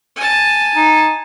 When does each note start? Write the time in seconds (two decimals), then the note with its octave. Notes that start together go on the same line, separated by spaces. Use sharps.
0.16 G#5 A5
0.76 D#4